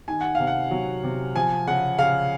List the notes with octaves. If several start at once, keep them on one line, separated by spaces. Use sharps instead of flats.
D#3 G#5
F#5
C3 F5
F#5
F#3
C3
F3 G#5
C#3 F#5
C#3 F5